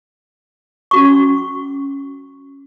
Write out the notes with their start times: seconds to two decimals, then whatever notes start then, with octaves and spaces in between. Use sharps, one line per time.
0.91 C#4 F#4 C#6